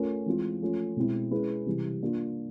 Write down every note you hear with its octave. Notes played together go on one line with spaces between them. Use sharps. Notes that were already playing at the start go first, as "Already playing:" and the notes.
Already playing: A3 C#4 F4 A#4
E3 G#3 C4 F4
F3 A3 C#4 F4
B2 G#3 C4 E4
G#3 C#4 E4 G#4 B4
C3 E3 G3
A#3 D4 F4